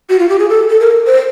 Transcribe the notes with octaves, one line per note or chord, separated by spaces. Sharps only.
F#4
F4
G4
G#4
A4
A4
A#4
C5